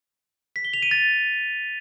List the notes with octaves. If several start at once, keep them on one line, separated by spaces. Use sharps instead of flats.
B6
G7
F7
D#7
A6